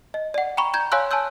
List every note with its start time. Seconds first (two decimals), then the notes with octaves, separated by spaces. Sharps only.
0.14 D#5
0.34 D5 F#5
0.57 G5 A#5 B5 C#6
0.74 A#5 G6 G#6
0.92 C#5 F5 G#5 C6 E6 F#6
1.11 G#5 A5 C6 E6 G6